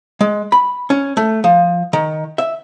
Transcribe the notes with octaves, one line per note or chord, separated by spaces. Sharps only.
G#3
B5
C#4
A3
F3
D#3
E5